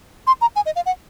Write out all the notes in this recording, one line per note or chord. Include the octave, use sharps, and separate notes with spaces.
C6
A#5
G#5
D#5
F5
F#5